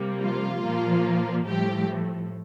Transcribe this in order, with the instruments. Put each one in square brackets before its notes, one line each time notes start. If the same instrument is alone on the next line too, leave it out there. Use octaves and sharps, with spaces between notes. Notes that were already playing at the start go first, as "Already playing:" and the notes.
Already playing: [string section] C3 G3 A#3
F3 F4
A#2 F3 A#3
A2 F3 G3 A3 G4